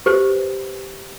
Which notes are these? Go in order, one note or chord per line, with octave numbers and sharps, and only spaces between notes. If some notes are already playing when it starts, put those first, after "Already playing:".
G4 B4 C5